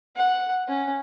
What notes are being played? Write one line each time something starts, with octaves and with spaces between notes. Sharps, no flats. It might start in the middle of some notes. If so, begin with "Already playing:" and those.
F#5
C#4